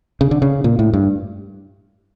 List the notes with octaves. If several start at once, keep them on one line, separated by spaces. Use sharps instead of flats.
C#3
D3
C#3
A#2
A2
G2